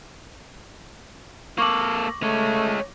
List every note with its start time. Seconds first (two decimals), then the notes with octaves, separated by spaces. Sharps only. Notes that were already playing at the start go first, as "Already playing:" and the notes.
1.58 A#3 A4 C#6 D6 F#7
2.23 G#3 A3 C#5